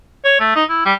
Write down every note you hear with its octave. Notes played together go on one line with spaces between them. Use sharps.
C#5
A3
D#4
E4
G3